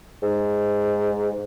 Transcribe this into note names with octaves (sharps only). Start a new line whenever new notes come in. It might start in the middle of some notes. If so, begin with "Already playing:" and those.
G#2